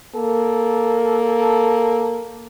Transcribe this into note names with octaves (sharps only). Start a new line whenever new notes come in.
A#3 A4